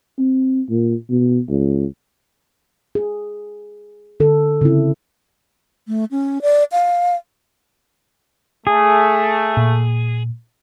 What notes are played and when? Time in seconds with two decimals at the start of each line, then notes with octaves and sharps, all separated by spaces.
0.19 C4
0.70 A#2
1.09 B2
1.49 C#2
2.95 G#4
4.20 D3 A4
4.61 C#3 C4 E4
5.88 A3
6.11 C#4
6.42 D5
6.72 F5
8.67 A3 G#4
9.57 A#2